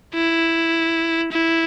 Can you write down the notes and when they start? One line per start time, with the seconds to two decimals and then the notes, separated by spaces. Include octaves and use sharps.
0.14 E4
1.32 E4